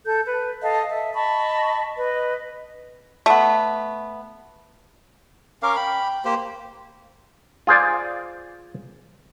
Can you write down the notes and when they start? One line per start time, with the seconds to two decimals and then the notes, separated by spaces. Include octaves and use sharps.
0.06 A4 G6
0.24 B4
0.61 A4 D#5 F5 A5
0.91 E5
1.15 D#5 A5 B5 C#6
1.97 B4 D#5
3.26 A3 B3
5.63 C#4 A#4 F5 D6
5.76 G5 B5
6.25 A#3 G4 C5
7.67 F4 G#4 C5 D5